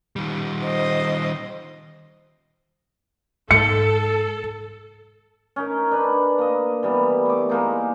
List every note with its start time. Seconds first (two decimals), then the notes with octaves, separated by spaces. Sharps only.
0.16 D#3 G3
0.62 C5 D#5
3.51 G#2 A4 C#7
5.56 C#4 D#4 A#4
5.91 D4 B4
6.39 A#3 D#5
6.83 E3 G3 A#3 B3
7.26 A3 D6
7.49 G#3 A#3 D#4